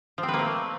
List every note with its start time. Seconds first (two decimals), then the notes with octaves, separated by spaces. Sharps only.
0.18 F3
0.23 C4
0.28 B4
0.34 A#3
0.39 A3